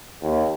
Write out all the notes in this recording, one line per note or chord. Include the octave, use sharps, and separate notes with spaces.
D#2